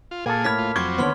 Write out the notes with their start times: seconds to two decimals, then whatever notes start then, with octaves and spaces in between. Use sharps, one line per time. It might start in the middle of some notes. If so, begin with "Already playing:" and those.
0.11 F4
0.26 A#2 A#3 G#4 A4
0.44 A2 B5 F6 G#6 B6
0.58 F4
0.76 F2 F#3 C4 C#6 D6 G#6
0.98 D#2 D3 B3 C#5 C6 F6 G7